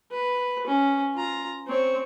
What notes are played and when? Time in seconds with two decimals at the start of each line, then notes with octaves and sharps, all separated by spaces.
0.11 B4
0.67 C#4
1.15 F4 A#5
1.67 C4 C#5